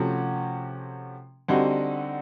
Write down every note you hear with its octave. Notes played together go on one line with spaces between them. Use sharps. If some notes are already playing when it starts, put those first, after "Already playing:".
Already playing: C3 F3 A3 C#4 F#4
D3 G3 C4 D#4 F#4